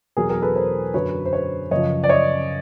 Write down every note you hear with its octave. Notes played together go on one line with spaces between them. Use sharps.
E2 B2 F#3 G#4 A#4
G#4 A#4
A4 B4
A#4 C5
F#2 D3 F#3 B4 C#5
C5
B4 C#5
F#2 C#3 F3 C#5 D#5
D5
C#5 D#5